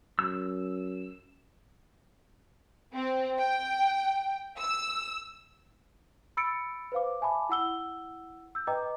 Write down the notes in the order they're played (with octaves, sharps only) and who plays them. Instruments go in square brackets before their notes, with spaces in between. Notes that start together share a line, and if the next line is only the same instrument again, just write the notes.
[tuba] F#2 [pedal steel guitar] E6
[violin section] C4
G5
E6
[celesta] B5 E6 A6 C#7 D7
B4 C5 F5 D6
E5 G#5 A5 B5 D6
E4 F#5 E6 G7
E6 G6
B4 D#5 G5 A#5 D6